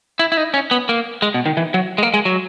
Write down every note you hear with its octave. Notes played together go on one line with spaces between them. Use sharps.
E4
E4
D#4
C#4
B3
A#3
G#3
B2
D#3
E3
F#3
G#3
A#3
G#3
F#3